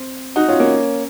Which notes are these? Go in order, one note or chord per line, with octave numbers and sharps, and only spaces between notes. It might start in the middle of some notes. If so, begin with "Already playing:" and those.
Already playing: C4
D#4 F#4
C#4 F4
A#3 C#4